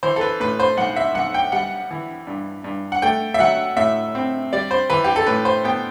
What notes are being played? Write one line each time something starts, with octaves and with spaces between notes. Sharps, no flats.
E3 C5
A4
B4
A2 B4
C5
B1 F#5
E5
B1 F#5
G5
G3 F#5
E3
G2
G2
F#5
A3 G5
E5
F#3 F#5
A2 E5
C4
G3 D5
C5
E3 B4
G4
A4
A2 B4
C5
B3 G5